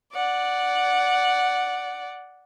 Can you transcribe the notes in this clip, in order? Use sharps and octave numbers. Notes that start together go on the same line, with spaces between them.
D5 F#5